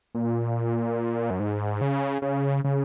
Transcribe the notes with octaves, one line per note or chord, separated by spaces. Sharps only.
A#2
F#2
G#2
C#3
C#3
C#3